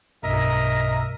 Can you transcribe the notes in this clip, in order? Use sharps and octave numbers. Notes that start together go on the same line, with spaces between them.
B1 G2 B2 A#4 D#5 E5 A#5